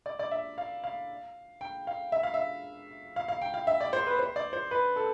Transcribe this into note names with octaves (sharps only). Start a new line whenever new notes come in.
D5
D5
E5
F5
F5
G5
F5
E5
F5
E5
F5
F5
G5
F5
E5
D5
C5
B4
C5
D5
C5
B4
A4